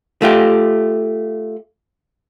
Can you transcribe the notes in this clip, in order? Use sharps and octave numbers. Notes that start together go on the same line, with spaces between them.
A3 F4 G4